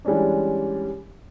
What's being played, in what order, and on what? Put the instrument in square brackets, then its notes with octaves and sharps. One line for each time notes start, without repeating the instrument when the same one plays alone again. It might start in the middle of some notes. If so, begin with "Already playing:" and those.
[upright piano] E3 G3 G#3 C#4 D4